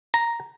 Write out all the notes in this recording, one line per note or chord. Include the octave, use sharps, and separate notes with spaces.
A#5